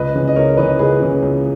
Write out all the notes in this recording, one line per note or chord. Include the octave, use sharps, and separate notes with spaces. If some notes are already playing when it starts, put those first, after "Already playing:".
Already playing: C#2 B4 D#5
C#3 E3
D#5
C#2 A#4 C#5
C#3 E3 B4 D#5
C#2 G#4 B4
C#3 E3
C#2